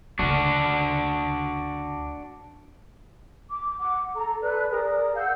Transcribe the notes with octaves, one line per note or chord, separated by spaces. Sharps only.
D2 C#3 D4 F#4
D6
F#5 D6
A4 A#5
A4 B4 D5 F#6
G#4 A#4 D5 D#6
F5 F#5 E6 G6